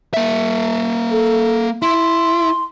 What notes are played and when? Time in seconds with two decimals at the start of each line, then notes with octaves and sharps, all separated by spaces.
0.14 A#3 E5
1.11 A4
1.82 E4 C6